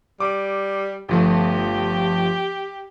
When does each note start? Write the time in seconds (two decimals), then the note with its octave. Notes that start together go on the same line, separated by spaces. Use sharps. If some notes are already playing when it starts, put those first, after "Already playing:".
0.20 G3 D6
1.09 G1 F3 A3 G4